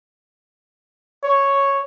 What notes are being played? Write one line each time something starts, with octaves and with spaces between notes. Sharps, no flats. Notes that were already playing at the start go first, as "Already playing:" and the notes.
C#5